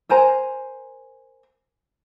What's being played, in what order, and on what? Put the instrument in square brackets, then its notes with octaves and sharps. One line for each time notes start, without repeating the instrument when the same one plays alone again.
[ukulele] A#4 C5 G#5 A#5